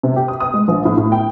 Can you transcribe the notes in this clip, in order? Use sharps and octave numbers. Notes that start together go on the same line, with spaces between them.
C3
G4
D#6
D#6
G#3
A#1
A2
A2
G5